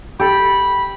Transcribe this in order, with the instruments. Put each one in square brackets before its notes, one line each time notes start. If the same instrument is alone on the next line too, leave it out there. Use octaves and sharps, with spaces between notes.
[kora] G4 A4 [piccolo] B5